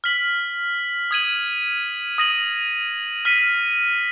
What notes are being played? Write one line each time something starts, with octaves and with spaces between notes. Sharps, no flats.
F6 B6 F#7
D#6 G#6 D#7 F#7
D#6 A#6 D#7 F#7
F6 B6 D#7